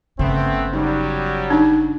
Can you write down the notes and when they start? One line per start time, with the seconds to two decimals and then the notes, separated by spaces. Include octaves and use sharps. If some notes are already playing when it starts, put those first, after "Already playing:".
0.19 G1 C#3 A3 B3 C4
0.73 F#3 G3 D#4
1.50 D4 D#4